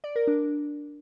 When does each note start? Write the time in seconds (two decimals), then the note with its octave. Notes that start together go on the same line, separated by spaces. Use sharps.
0.04 D5
0.16 A#4
0.27 D4